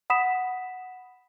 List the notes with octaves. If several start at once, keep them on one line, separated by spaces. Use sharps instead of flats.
F#5 B5 D#6 B6 E7